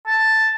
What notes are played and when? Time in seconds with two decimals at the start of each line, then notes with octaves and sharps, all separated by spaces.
0.07 A5